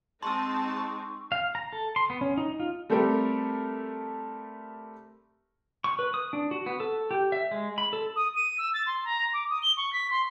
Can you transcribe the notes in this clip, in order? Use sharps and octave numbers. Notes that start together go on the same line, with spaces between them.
G#3 C4 D#4 A5 C6 C#6 E6
F5
A#5
A4
C6
B3
C#4
D#4
F4
G3 A3 C4 G4 A4 A#4
C#6
B4
D#6
D4
F#4
B3
A4
G4
E5
G#3
B5
A4
D#6
D#7
E6
A6
C6
A#5
D6
D#6
G7
C#6
B6
C6